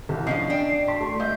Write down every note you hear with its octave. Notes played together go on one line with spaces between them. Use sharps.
C2
F3 C#4 D4 D#5 C7
D4 G5
A5 C6 B6
A3 C#6
G#3 D#5 E5 G6